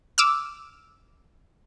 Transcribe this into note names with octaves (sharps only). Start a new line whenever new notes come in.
D6 E6 F6